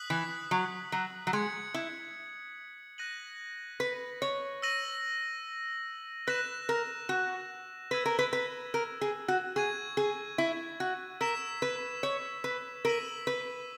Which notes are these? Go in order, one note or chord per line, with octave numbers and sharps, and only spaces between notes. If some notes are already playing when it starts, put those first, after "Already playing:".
Already playing: D#6 F#6 B6 F#7
E3
F#3
F#3
F#3
G#3 G#6 C#7 F#7
E4
F#6 A#6 D#7 F#7
B4
C#5
E6 A#6 D#7 F#7
B4 F#6 A#6 E7
A#4
F#4
B4 E6 G#6 D#7 F#7
A#4
B4
B4
A#4
G#4
F#4
G#4 C#6 G#6 D#7
G#4
E4
F#4
A#4 E6 B6 E7
B4
C#5
B4
A#4 E6 B6 D#7 F#7
B4